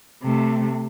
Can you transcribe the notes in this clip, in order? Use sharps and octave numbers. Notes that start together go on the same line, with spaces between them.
C3 A3